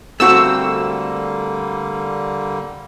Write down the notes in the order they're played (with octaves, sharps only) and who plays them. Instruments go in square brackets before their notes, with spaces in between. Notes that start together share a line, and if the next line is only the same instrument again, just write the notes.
[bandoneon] D3 G3 A#3 [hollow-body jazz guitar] A3 C4 F#4 [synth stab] E6